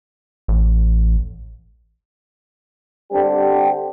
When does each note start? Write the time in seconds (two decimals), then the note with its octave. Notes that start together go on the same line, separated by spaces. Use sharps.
0.48 A1
3.13 D3 G3 C4 D4 G4